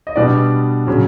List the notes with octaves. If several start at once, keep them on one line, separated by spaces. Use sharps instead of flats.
D#5
B2 G3 B3 D4 D5
C#3 F#3